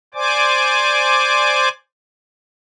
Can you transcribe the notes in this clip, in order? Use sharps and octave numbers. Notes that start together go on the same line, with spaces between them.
C5 D5 G#5 D6